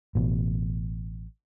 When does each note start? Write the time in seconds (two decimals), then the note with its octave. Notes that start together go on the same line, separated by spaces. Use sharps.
0.15 A1 B2